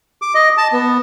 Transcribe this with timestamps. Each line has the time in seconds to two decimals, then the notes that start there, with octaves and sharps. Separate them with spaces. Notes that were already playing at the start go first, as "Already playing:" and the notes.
0.22 D6
0.35 D#5
0.57 A5
0.72 B3